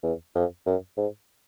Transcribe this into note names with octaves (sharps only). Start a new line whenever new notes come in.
E2
F2
F#2
G#2